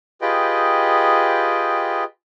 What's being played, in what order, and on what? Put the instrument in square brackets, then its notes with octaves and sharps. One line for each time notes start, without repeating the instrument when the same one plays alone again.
[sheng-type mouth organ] F4 G4 G#4 B4 D#5 G5